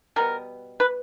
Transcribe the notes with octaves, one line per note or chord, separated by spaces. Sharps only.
B2 G3 B3 A#4
B4